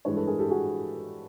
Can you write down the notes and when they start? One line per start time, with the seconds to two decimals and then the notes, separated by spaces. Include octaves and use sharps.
0.05 G2 E3 G#3 B4 C#5
0.16 A4 B4
0.27 G#4 A#4
0.39 G4 A4
0.50 F#4 G#4